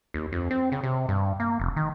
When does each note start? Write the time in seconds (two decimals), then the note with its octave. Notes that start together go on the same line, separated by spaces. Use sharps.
0.14 D#2
0.32 F2
0.51 C4
0.72 C#3
0.83 C3
1.09 G2
1.40 A#3
1.60 F1
1.76 D#3